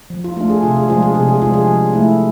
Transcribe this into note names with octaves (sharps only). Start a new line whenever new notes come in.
F3
F4
A3 D4 F4
G#4
C3 F4
G#4
F3 G#3 D4 F4
G#4
C3 G#4
G#4
F3 G#3 D4 F4
G#4
F3
A3 E4